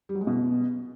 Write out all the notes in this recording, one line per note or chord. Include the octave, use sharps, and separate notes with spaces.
G3
F#3
G#3
B2